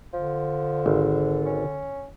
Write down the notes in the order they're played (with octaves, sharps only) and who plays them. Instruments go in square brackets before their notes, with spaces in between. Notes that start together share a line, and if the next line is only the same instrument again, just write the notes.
[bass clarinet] D3 [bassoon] F3
[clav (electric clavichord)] G#1
[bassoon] C#4